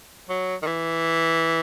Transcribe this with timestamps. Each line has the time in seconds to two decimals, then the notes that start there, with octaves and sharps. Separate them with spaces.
0.29 F#3
0.62 D#3
0.67 E3